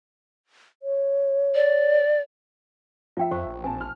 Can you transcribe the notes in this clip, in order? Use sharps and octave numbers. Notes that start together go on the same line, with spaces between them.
C#5
D5
F3 F4 E5 G5
F2 C5 C#6
A#1
C4 G#5 A5
F6